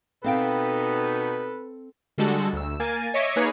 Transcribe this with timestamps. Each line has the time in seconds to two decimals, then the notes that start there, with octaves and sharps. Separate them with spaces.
0.24 B2 B3 C4 D#4 A4 B4 F5 G5
2.18 D3 G3 G#3 F#4 A4
2.53 D2 E6
2.80 A#3 G#5 A6
3.14 C#5 D#5 E5 C#6 D6
3.36 A#3 D#4 G#4 B4 C#5